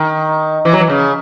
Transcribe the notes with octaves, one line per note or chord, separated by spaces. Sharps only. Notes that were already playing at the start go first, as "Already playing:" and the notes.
Already playing: D#3
E3
F#3
E3
C#3